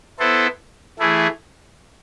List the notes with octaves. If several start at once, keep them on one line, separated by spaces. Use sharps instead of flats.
B3 E4 A4 C5
E3 A3 E4 G#4